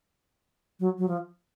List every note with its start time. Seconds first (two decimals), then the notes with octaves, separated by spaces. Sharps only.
0.80 F#3
0.98 F#3
1.08 F3